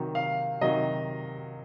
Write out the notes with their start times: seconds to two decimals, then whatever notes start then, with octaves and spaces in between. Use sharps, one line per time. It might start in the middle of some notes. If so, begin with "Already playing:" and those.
Already playing: C3 D#3 F#3
0.15 F5
0.61 C3 D#3 F#3 D#5